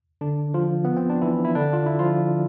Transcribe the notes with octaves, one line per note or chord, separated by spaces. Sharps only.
D3 D4
F3 F4
B3
C4
D4
E3 E4
E4
D3 D4
F4
E4
F3 F4